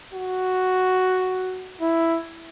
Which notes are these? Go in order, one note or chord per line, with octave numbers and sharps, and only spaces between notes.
F#4
E4